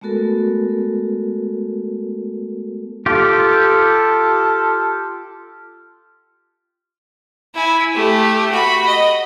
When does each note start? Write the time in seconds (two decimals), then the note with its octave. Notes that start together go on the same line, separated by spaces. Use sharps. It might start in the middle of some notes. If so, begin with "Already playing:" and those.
0.01 G#3 A3 B3 F#4 A4 A#4
3.06 F4 G4 A4
7.54 E4 G#5
7.95 A3 G4
8.52 F#4 B5
8.86 D#5